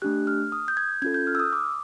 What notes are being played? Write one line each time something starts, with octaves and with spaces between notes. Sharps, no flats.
A3 D4 G4 F#6
F6
D#6
G6
G#6
C#4 F4 A4 G#6
G6
F6
E6
D#6
D6